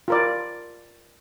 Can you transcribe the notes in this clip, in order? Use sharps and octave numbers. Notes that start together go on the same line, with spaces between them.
F4 A#4 D5